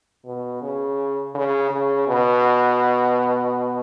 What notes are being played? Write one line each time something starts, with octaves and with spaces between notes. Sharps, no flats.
B2
C#3
C#3
C#3
B2